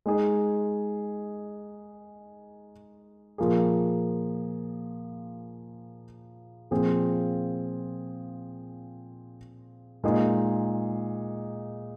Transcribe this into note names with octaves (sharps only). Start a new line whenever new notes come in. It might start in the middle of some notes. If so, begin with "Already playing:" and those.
G#3 D#4 G#4
A#2 F3 A#3 G#4
A#2 F3 C4 F4 G#4
A#2 G#3 D#4 G#4